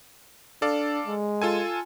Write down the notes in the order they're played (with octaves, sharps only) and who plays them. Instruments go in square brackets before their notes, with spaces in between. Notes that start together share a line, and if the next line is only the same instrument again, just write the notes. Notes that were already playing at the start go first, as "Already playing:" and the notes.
[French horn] D4 [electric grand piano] A4 D5 F5
[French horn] G#3
[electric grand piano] F4 A4 G#5